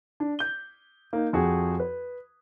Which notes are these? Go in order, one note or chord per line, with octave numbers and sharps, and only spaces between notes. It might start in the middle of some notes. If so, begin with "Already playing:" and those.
D4
G6 G7
A#3 D#4
F2 F#4 G#4
B4